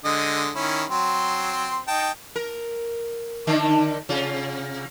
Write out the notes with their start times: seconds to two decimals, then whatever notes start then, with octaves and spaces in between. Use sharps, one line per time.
0.05 D3 G#3 D#5
0.56 D#3 C#4 E4
0.90 F#3 C4 C6
1.88 D#4 G5 A5
2.36 A#4
3.47 D3 D#3 D4
4.09 C3 F4